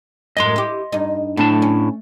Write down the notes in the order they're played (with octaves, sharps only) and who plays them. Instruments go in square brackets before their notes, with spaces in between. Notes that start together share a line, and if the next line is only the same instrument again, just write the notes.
[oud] F#2 A2 A#4 [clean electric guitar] D#5 C6
[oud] E4 G4
G2 D#4
[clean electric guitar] A2 D4 A5 [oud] A3
[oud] C#4